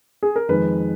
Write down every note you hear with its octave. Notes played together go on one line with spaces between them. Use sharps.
G#4
A#4
F2 D#3 G#3 B4